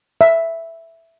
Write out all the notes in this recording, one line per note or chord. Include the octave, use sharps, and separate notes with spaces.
E5